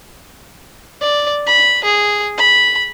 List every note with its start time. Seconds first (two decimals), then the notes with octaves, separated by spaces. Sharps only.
1.02 D5
1.47 B5
1.84 G#4
2.38 B5